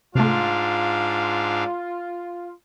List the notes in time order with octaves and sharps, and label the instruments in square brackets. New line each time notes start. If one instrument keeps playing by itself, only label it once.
[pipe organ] G#2 D4 F5 [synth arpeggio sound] C3 A3 [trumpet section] F4